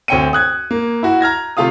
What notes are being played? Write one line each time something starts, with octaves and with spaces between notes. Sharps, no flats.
D2 C4 C#5 G5 C#7 D#7
D#6 F#6 G#6
A#3
E4 F#4
A#5 F6 G#6 A#6
C3 A3 F4 F5 D#6